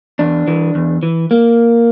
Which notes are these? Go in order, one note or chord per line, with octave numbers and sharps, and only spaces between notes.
E2 D4
E3
E2
E3
A#3